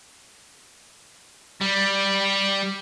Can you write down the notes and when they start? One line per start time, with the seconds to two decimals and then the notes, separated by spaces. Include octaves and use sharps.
1.61 G3